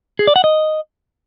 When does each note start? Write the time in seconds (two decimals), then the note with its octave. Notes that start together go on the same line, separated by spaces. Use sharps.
0.19 G#4
0.27 D5
0.36 F#5
0.44 D#5